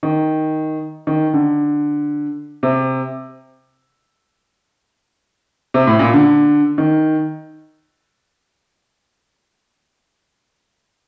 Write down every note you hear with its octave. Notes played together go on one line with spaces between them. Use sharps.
D#3
D#3
D3
C3
C3
A2
A#2
D3
D#3